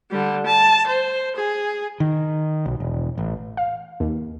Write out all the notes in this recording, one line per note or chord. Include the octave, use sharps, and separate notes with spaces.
D3 G3
A5
C5
G#4
D#3
B1
E1
A1
F5
D#2